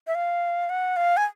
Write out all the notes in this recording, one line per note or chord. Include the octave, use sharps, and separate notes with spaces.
E5
F5
F#5
F5
G#5